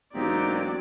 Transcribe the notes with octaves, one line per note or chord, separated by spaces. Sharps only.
E1 F#3 A#3 C4 D#4 G4 D5